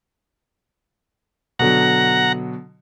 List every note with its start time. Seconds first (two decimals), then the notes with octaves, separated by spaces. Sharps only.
1.59 B2 D3 F#3 F#5 A#5